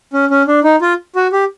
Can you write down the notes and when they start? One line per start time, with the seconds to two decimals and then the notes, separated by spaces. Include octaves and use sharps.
0.13 C#4
0.30 C#4
0.48 D4
0.64 D#4
0.81 F4
1.15 F#4
1.32 G4